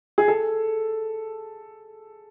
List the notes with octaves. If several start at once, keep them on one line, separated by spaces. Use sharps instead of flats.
G#4
A4